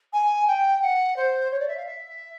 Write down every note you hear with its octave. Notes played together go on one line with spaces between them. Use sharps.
G#5
G5
F#5
C5
C#5
D5
E5
F5
E5